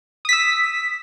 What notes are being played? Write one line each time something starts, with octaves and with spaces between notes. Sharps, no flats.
D#6 E6 B6